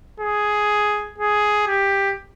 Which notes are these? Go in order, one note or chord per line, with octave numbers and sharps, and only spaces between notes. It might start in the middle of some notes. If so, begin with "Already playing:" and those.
G#4
G#4
G4